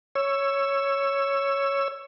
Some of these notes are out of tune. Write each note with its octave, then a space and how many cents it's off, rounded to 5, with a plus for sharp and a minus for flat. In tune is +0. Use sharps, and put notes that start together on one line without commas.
C#5 +0 E6 +15